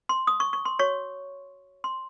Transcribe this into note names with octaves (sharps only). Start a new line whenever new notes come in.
C6
D#6
C#6
C#6
C6
F#4 C#5 C#6
C6